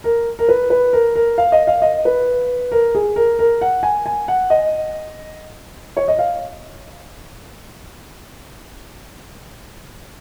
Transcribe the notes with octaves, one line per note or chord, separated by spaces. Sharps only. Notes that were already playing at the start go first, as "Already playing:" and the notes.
A#4
A#4
B4
B4
A#4
A#4
F5
D#5
F5
D#5
B4
A#4
G#4
A#4
A#4
F#5
G#5
G#5
F#5
D#5
C#5
D#5
F5